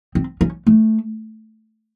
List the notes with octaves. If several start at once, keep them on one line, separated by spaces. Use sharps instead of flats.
C4
C#4
A3